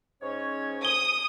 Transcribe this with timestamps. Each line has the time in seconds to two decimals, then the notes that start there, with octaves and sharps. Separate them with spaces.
0.22 G#2 C#4 C#5
0.85 D#6 G7